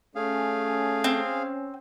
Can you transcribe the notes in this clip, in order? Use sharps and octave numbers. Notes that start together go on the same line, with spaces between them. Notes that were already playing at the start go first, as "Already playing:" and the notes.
A3 C#4 G#4 F5
C4